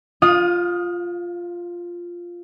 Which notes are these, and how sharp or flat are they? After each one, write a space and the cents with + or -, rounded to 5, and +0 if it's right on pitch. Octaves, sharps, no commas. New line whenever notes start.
F4 +0 F5 +35 D#6 +0